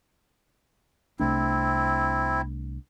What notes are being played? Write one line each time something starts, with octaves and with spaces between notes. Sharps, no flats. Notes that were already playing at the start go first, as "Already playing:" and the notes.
C2 A3 C4 D4 E4